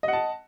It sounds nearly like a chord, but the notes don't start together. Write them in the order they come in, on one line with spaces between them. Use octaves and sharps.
D#5 F#5 A5